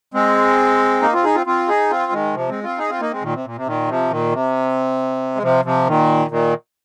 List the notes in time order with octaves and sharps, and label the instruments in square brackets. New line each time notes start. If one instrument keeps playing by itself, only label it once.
[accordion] G#3 C4
A#3 D#4
C4 F4
D#4 G#4
C4 F4
C4 F4
D#4 G#4
C4 F4
D#3 G#3
C3 F3
G#3 C4
C4 F4
D#4 G#4
C4 F4
A#3 D#4
G#3 C4
A#2 D#3
C3
A#2
C3
A#2 D#3
C3 F3
A#2 D#3
C3
G#3
C3 F3
C3 F3
A#2 D#3
A#2 D#3